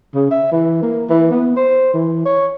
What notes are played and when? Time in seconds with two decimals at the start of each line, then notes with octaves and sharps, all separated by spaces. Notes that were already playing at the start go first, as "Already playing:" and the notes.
0.15 C#3
0.31 E5
0.52 E3
0.83 A#3
1.09 E3
1.31 B3
1.56 C5
1.94 E3
2.25 C#5